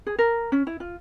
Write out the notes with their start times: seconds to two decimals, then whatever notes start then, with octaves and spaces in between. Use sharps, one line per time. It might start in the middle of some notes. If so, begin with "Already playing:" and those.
0.07 G#4
0.19 A#4
0.52 C#4
0.67 E4
0.80 F4